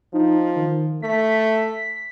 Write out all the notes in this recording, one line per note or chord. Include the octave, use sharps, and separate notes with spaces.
F3 D#4
D#3
A3 B6